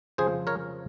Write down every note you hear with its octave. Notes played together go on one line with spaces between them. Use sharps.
F2 C#3 F3 G#4 C5
A#4 C#5